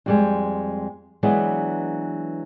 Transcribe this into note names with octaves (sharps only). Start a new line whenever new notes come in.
F2 G3 G#3
E3 F#3 G#3 B3 D4